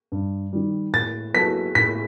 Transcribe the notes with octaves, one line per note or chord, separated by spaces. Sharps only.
G2
D#3 G3
A2 A6
F#3 B3 E4 A4 B6
A2 B6